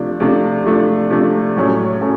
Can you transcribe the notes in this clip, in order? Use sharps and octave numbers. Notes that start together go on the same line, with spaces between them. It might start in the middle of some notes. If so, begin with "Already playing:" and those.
Already playing: C3 F3 A3 D4
C3 F3 A3 D4
C3 F3 A3 D4
C3 F3 A3 D4
A2 F#3 A3 C#4
A2 F#3 A3 C#4